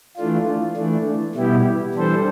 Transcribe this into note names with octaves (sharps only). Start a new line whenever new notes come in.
E3 A3 D4 F4
E3 A3 D4
B2 G3 B3 E4 G4
E3 G3 D4 A4 C5